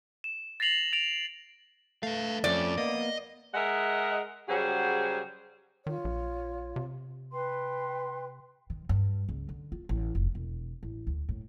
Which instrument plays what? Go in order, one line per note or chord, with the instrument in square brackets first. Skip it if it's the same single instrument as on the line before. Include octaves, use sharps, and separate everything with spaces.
[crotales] E7
A6 A#6 C7 F7 F#7
A6 D7 F7
[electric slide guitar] A3 [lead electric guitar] B4 F5
[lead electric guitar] F2 [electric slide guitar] F3 A3 C#4 [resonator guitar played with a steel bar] D5
[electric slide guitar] A#3 B3 [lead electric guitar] D#5
[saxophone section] G#3 G#4 A#4 D#5 E5 F#5
C#3 F#3 G3 F#4 G#4 C5
[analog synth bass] D#3 [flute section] F4 C#5
[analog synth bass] A#1
C3
[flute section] B4 G5 C6
[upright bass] D#3
G2
C#2
D3
F4
A1
F1
E1
A1
D2
A2